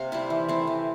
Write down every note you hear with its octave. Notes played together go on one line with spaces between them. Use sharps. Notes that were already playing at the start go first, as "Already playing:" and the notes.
Already playing: C3 A#3 F5
G3 C4 E4
E3
A3 C4 E4
E3